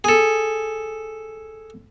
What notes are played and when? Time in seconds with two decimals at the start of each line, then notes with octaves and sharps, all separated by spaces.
0.04 G#4 A4